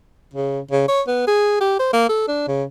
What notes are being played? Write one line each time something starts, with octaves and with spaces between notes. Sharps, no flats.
C#3
C#3
C#5
B3
G#4
G4
C5
A#3
A4
D4
C#3